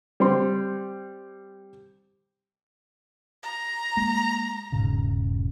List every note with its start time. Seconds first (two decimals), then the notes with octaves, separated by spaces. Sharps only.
0.20 G3 C4 C6
3.43 A#5
3.97 G#3 A#3
4.72 E1 G#2 C#3